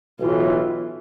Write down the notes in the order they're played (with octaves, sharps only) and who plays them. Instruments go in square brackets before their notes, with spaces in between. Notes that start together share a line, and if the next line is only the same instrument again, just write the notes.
[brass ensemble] B1 A2 E3 [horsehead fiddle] F4